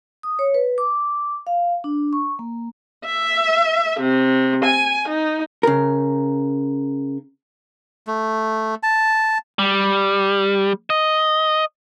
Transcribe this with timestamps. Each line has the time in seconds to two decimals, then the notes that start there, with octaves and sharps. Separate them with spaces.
0.23 D#6
0.39 C#5
0.54 B4
0.78 D6
1.47 F5
1.84 D4
2.13 C#6
2.39 A#3
3.03 E5
3.99 C3
4.64 G#5
5.08 D#4
5.63 C#3 A#4
8.06 A3
8.83 A5
9.59 G3
10.90 D#5